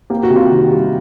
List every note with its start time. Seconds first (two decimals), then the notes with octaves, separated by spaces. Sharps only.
0.10 A#3 G4
0.23 F#4
0.30 C3
0.36 F4 G4
0.50 D#3
0.70 G3